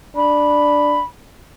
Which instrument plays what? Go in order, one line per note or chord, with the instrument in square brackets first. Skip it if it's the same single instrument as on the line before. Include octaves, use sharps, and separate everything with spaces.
[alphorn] D4 [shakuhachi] B5